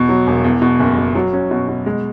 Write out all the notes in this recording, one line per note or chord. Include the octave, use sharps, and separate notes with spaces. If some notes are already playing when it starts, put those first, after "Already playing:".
Already playing: E2 B2
F#3
E1
E2
B2
F#1
F#1
F#3
C#4
B2
B2
G#3